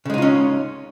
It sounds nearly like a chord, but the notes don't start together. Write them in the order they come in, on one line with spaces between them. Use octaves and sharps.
C#3 G#3 D#4 F4 C#4